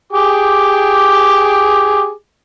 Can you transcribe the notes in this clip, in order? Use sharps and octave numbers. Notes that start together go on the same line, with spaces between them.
G4 G#4 D6